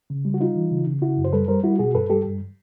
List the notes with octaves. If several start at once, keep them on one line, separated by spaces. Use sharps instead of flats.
C#3
G3
F#4
G3 D#4 F4
E3
C#3
C#3
C#3 E4 F#4
F#2
C5
G3 A4 B4
G3 A#4 C5
G3 E4 F#4
B2 F#4 G#4
G2 A4 B4
G3 G4 A4
G2